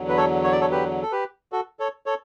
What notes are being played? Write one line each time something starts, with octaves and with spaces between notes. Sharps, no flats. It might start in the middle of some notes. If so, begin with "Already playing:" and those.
Already playing: E2 D3 F#3
B4
A4 C#5
C#5
D5
A4 C#5
G4 B4
A4
G4 B4
F#4 A4
A4 C#5
A4 C#5